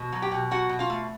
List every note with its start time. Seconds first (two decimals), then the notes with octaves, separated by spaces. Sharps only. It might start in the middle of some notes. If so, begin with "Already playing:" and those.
Already playing: B2
0.12 F#3
0.22 G4 G5
0.32 B2
0.51 F#3 F#4 F#5
0.69 B2
0.79 F4 F5
0.90 A3